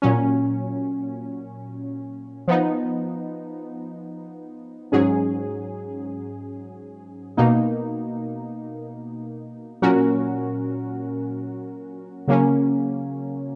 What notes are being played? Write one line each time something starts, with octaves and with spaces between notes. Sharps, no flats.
A#2 F#3 C#4
F3 B3 D#4
G#2 F#3 C#4 G#4
B2 A#3 D#4
A#2 F#3 C#4 F#4 A#4
C#3 F#3 A#3 C#4